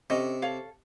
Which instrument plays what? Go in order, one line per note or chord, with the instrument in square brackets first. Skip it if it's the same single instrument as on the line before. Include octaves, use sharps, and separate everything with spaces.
[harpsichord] C3 [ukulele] C#4 A4 D#5
[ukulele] A4 C#5 F5